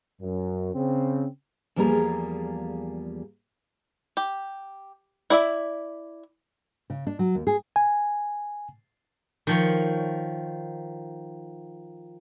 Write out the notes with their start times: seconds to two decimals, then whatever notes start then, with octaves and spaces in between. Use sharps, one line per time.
0.22 F#2
0.75 C#3 C4
1.76 E2 F3 G3 A#3 G#4 A#5
4.17 G4
5.30 E4 D5 E5
6.90 C#3
7.07 D4
7.19 F#3
7.35 D#2
7.47 G#4
7.76 G#5
9.47 D#3 F3 C#5